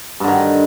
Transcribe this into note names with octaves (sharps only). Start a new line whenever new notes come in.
G2 D3 D#3